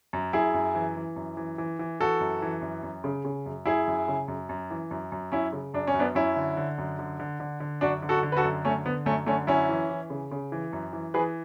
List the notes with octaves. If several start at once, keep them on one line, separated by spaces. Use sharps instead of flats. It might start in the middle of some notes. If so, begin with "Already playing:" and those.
F#2
F#2 E4 G#4
F#2
E3
E3
F#2
E3
E3
E3
E3 F#4 A4
F#2
E3
F#2
F#2
C#3
C#3
F#2
F#2 E4 G#4
F#2
C#3
F#2
F#2
E3
F#2
F#2
F#2 C#4 E4
C#3
F#2 D4
C#4
F#2
B3 D4
F#2 C#4 E4
D3
D3
F#2
D3
D3
D3
D3
F#2 D4 F#4
D3
F#4 A4
D3
B4
F#4 A4
F#2
D3 A3 C#4
D3 B3
F#2 A3 C#4
D3 A3 C#4
F#2 C#4 E4
E3
E3
C#3
C#3
E3
F#2
E3
E3 G#4 B4